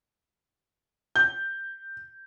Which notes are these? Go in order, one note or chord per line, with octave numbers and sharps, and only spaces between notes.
G6